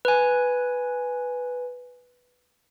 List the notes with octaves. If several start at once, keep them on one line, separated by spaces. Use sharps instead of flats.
B4 G#5